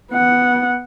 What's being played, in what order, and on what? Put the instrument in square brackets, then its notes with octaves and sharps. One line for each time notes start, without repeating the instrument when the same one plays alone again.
[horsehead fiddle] B3 F#5